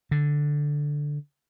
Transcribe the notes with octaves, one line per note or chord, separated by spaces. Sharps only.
D3